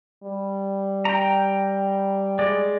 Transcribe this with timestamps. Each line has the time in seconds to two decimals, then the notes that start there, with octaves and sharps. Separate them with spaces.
0.24 G3
1.05 G5 A#5
2.39 G#3 D5